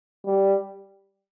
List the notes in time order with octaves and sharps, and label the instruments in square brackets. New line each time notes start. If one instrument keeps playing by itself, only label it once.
[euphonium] G3